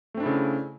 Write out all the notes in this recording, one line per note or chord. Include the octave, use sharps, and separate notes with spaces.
C#3 A3 C4 D4 E4